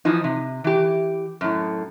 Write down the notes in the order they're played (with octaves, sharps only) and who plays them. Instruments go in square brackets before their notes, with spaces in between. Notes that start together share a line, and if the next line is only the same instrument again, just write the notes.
[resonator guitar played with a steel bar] E3 F3 D#4
C3
E3 G4
F#2 A2